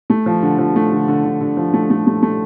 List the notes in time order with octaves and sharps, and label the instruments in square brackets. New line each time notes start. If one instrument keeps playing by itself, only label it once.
[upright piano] A3
F3
D3
F3
A3
D3
D3
D3
D3
F3
A3
A3
A3
A3